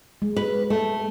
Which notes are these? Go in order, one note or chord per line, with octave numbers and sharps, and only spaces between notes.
G#3
B4
A3